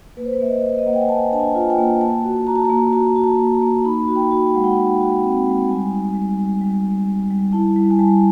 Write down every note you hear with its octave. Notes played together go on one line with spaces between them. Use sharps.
A#3 B4
C5
B4
A#3 E5
D#5
A#3
D#5
A#3 F#5
G5
G#5
A#3 A5
D4 A5
G#5
F4
G5
A#3
A#3 A5
F#4
F#4 A#5
A5
A#3 A#5
F#4 A5
F#4
A5
A#3
A#5
A#3
D#4 B5
F#4
G5
F#4
G5
G#3 F#5
G5
D#4
F#4
C4
G#3
G3 G#5
D#4
G3
G3
G3
G3
G3
G3
E4 A5
G3
G#5
G3 A5